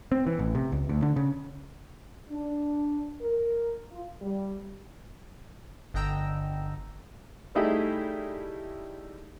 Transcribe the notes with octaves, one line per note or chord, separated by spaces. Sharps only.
C4
E3
A1
C3
C#2
D2
D3
C#3
D4
A#4
F4
G3
G1 D3 D#5 G5 A#5 E6
G3 A3 D#4 E4 G4 G#4